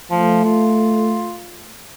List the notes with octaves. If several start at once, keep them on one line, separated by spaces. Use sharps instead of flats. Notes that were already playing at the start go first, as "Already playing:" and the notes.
F3 A3
F4